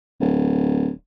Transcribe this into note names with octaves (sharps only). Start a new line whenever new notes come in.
D1